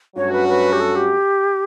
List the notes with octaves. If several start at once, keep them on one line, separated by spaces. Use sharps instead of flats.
G2 F#3 A3 C#4 F#4 C#5
B4
B4
G4
A4
G4